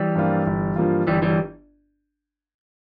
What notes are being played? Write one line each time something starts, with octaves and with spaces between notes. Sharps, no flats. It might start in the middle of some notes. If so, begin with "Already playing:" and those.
Already playing: E3 G3
G2 F3 A#3 F4
G1
G2 F3 A#3 F4
G1 E3 G3
E3 G3